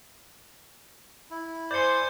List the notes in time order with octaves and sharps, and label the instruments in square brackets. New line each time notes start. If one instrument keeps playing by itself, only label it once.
[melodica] E4
[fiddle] C5 G#5 [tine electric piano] D5 C6 [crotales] G6 C#7